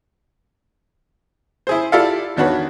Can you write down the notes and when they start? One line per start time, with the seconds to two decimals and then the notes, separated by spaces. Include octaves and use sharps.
1.67 E4 G#4 C5
1.92 E4 F4 G4 A4 D5 F5
2.36 E2 D#3 D4 F#4 B4 C#5